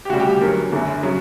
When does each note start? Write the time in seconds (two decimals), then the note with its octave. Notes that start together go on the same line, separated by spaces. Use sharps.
0.05 G4
0.09 D2 C#3 G3 F#4
0.20 G4
0.30 G4
0.41 E2 D3 F#3 A#4
0.72 F#1 F#2 D3
1.03 C#3 F#3